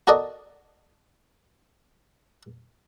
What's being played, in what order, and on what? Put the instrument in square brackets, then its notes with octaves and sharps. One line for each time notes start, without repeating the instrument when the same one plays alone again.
[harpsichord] F#4 A4 A#4 D5 D#5